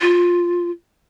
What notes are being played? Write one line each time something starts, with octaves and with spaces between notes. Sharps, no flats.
F4